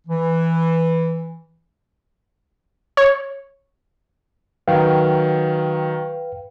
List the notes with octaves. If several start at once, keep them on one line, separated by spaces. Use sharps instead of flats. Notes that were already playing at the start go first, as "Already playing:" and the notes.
E3
C#5
D#3 F#3 B4 F5 G5